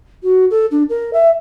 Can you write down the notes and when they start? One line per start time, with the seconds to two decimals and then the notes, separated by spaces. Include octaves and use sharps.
0.23 F#4
0.51 A4
0.71 D4
0.89 A#4
1.13 E5